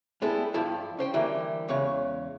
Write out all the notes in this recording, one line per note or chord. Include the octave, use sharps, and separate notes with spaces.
G3 G#3 B3 E4 A4
G2 F3 E4 F4 A5
C#4 C5 G5
D3 E3 G3 A#3
E2 C#3 G#3 C#5